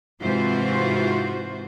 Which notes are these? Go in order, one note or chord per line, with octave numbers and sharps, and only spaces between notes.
G#2 C3 E3 F4 F#4 C5